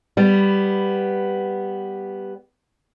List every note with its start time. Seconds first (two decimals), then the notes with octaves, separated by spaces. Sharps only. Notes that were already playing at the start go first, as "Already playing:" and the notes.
0.17 G3 B3